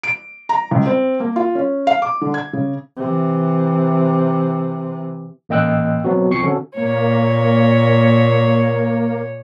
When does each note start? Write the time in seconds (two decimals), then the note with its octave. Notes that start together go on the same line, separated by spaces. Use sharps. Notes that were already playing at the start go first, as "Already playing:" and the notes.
0.03 D7
0.49 A#5
0.71 C#2
0.86 C4
1.20 A#3
1.36 F4
1.55 C#4
1.87 F5
2.02 D6
2.21 D3
2.34 G#6
2.53 C#3
2.97 C3 E3
5.49 A1 A#3 D#5 G5 E6 F#6
6.04 F#3 B3 C4 F#4
6.30 C2 F3 C4 C#6 C7 C#7
6.42 D3 C4 C#4 F#4 A4
6.77 A#2 A#3 C#5